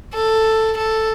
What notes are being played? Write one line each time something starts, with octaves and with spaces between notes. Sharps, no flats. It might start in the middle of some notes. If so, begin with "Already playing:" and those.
A4
A4